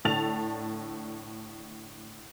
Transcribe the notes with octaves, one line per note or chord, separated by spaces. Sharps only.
A2 D3 A4 A5 A6 F7